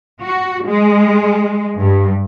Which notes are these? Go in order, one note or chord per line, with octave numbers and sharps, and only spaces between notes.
F#4
G#3
G2